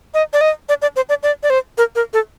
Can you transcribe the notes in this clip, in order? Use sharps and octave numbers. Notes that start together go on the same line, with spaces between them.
D#5
D5
D#5
D5
D5
C5
D5
D5
D5
C5
A#4
A#4
A4